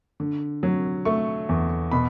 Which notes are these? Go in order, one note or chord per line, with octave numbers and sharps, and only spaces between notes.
D3
F#3
A3 C#6
E2
B2 B5